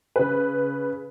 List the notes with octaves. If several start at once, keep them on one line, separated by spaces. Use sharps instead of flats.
C#3 B4